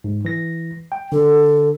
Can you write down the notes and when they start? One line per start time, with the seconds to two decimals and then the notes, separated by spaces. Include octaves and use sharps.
0.04 G#2
0.25 E3 A#6
0.92 G5
1.12 D3 A4